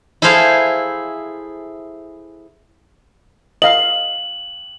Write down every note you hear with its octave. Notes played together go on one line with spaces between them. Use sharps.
E4 G#4 A4 C5 F5
D#5 F5 F#7